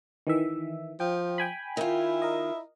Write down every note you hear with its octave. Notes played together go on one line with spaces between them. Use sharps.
D#3 E3 E5
F3 G5
G5 G#5 B5
D#3 E4 F4
A#4 D#5